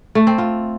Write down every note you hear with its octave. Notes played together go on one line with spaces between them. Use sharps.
A3
C4
F4